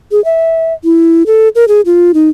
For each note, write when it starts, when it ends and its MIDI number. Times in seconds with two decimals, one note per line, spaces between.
0.12 0.23 68
0.25 0.73 76
0.84 1.23 64
1.26 1.48 69
1.55 1.65 70
1.68 1.81 68
1.86 2.12 65
2.14 2.29 63